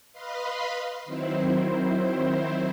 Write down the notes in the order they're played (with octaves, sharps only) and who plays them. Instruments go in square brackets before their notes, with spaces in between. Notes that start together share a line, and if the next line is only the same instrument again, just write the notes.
[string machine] B4 D#5 F5 B5 C6
D#3 F#3 C4 E4 C5